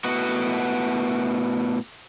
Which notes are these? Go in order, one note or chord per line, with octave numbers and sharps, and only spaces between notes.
A2 B3 F#4